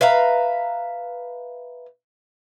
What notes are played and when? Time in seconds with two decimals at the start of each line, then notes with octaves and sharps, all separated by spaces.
0.01 B4 E5 F5 A#5